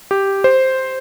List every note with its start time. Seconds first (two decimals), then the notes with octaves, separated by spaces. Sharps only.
0.11 G4
0.44 C5